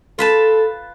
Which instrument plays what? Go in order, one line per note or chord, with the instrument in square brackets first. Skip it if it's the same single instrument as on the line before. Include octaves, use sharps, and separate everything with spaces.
[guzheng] F4 B4 A5 [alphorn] A4